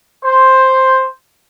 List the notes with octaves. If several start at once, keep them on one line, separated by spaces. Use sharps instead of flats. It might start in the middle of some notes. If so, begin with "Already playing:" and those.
C5